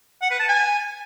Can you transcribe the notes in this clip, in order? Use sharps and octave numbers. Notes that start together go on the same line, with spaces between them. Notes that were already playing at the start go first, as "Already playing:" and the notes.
F#5
B4
A5
G#5